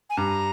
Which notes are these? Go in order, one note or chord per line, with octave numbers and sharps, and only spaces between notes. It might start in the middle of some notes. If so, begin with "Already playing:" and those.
G#5
G2 A#5